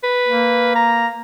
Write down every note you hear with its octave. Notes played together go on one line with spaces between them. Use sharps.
B4
A#3
A#5